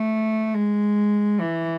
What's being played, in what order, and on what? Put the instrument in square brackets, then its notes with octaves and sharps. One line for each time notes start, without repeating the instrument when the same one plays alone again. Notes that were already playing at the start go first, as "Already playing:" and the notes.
Already playing: [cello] A3
G#3
E3